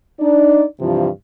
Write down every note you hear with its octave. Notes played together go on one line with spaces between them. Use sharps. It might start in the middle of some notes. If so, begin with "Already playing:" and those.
D4 D#4 D5
G2 C3 E3 F3